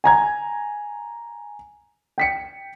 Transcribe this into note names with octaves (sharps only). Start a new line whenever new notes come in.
G#5 A#5 G#6
G5 B6 C#7